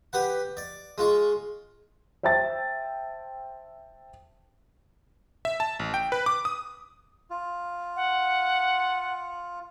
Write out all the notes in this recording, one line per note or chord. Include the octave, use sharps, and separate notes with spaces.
G4 B4 F#5
D5
G#3 F4 C#6
C5 E5 G5 A5 A6
E5
A5
A1
G5
B4
D6
D#6
F4
F#5